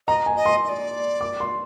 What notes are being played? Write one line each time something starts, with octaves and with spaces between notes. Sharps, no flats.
D#5 A#5
G#5
D#5
C6
D#5
D5
D6
C6